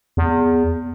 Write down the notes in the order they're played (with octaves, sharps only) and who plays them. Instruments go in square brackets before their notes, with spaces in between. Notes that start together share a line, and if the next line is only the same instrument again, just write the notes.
[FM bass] E2